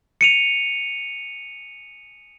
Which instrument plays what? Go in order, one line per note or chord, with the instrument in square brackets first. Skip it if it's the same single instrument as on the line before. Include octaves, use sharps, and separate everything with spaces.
[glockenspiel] C#7 D#7 F7